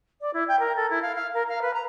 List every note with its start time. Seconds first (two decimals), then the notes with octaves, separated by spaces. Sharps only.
0.20 D5
0.33 E4
0.48 G5
0.59 A#4
0.76 A4
0.90 E4
1.01 F5
1.15 F5
1.34 A#4
1.48 F5
1.61 B4
1.73 A#5